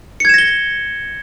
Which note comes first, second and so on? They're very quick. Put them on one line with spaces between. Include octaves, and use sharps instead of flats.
C#7 G#6 E7 A#6 G7